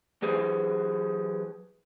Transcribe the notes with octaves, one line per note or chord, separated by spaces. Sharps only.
E3 F#3 G#4 C5